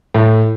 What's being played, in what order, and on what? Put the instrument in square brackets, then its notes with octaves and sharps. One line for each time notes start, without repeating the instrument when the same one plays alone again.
[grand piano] A2